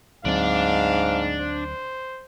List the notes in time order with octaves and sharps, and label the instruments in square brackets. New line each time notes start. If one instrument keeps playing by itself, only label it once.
[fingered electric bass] D2 F#3 C4 [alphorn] G#2 [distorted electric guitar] D4 D5 [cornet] F5
[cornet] C5